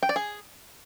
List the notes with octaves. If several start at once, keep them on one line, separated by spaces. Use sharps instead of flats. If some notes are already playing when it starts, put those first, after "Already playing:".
G5
D5
G#4